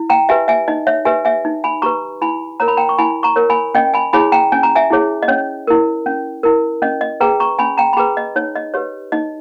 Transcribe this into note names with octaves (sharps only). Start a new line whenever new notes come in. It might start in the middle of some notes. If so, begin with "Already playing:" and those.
Already playing: E4
G5 A#5
G4 B4 E5 G#5
E5 G#5
D#4 D#5
C#5 E5
G4 B4 E5 G#5
E5 G#5
D#4
G#5 B5
G4 B4 A#5 C#6
E4 G#5 B5
A#4 C#5 A#5
B5
G5 A#5
C#6
E4 G#5 B5
A#5 C#6
A#4 C#5
G#5 B5
C#4 D#5 G5
G#5 B5
E4 G#4 C#5 G#5 B5
G5 A#5
C#4 G#5
A#5
E5 G#5
E4 G#4 C#5
D#5
C#4 C#5
E4 A#4
C#4
E4 A#4
C#4 D#5
D#5
G#4 B4 G5 A#5
A#5 C#6
C#4 G#5 B5
G5 A#5
B5
G#4 B4 G5 A#5
D#5
D#4 C#5
D#5
G4 B4 C#5
D#4 D#5